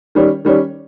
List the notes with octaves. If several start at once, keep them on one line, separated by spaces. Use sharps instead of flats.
D#3 G3 C#4
D#3 G3 C#4